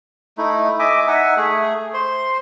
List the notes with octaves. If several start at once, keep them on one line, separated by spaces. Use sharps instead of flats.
A3 D#4 E4
D#5 E5 G#5 D6
D#4 E5 F#5 G#5
A3 G#4
C5 C6